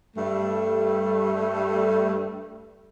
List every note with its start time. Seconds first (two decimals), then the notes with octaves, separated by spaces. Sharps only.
0.17 G2 G3 A3